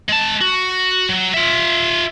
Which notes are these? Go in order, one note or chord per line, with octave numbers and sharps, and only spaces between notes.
G#3 A5
F#4
F#3
F4 E5